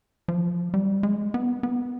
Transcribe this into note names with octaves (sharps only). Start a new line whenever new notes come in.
F3
G3
G#3
B3
B3